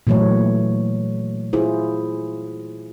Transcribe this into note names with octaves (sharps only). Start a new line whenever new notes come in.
A#2 E3 F#3 A3 C#5
E4 F4 G#4 C5